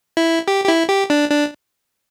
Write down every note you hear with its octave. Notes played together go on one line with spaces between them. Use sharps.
E4
G4
G4
E4
G4
D4
D4